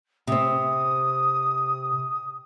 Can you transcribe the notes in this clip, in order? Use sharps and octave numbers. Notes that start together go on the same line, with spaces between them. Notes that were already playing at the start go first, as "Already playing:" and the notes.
C3 C4 D#6